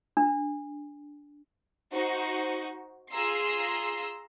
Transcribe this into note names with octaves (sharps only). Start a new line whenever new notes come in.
D4
D#4 F#4 C5
F4 G#4 A#5 C6 E6 C7